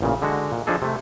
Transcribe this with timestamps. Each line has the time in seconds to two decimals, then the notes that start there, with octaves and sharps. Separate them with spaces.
0.01 A1 A#2 C#3
0.22 D3 G#3 F#4
0.52 A#2
0.67 F3 D4 D#4 G#4 A4
0.82 C3 A3